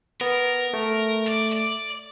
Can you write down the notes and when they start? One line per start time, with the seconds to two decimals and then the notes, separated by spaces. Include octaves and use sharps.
0.21 B3 A#4
0.73 A3
1.28 D5
1.53 D5